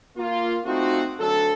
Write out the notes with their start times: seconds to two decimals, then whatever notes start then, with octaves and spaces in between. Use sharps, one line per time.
0.17 A#3 F4
0.65 A3 C4 D#4 F4 F#4
1.20 D2 F#3 D4 A4